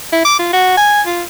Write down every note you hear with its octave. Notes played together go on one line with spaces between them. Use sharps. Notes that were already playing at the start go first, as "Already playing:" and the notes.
E4
D6
F4
F#4
G#5
F4